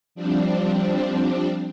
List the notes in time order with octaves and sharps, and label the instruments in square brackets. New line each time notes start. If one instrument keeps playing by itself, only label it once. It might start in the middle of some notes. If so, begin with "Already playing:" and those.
[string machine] F3 G3 C4 D4